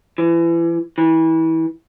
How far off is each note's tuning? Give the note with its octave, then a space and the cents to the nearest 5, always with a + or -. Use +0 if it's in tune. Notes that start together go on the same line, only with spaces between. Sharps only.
E3 +30
E3 -25